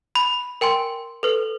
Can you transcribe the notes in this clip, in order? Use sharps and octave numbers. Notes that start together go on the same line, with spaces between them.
B5
A#4 G5 G#5 C6
A4 B4